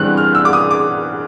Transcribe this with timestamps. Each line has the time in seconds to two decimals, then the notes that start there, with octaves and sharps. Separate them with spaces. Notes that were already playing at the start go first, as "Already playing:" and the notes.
Already playing: G2 E3 G3 C4 F#6
0.17 F6
0.35 E6
0.45 D6
0.53 D#6
0.71 D6